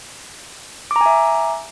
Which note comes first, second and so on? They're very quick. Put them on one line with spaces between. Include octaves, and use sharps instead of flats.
D6 A#5 G#5 E5